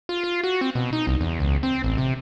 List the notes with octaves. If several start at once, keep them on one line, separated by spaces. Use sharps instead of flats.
F4
F4
F#4
C4
B2
D#4
C2
E2
C#2
C4
A1
C3